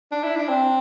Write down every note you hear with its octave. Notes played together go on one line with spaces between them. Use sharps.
D4
E4
D4
C4